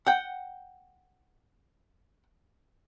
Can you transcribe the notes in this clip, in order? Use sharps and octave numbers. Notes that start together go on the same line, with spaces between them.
F#5 G5